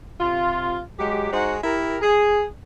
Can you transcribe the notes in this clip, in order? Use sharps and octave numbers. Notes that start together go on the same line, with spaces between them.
C3 F4
F#3 G#3 G4
G#3 D#4 F#4 C5 F#5
E4 G4 A#4
G#4